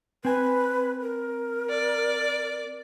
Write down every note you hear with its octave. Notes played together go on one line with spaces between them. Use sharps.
C4 B4 G#5
A#4
D5